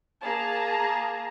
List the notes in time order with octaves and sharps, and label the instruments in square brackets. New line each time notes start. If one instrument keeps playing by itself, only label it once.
[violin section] A#3 G#4 A5 A#5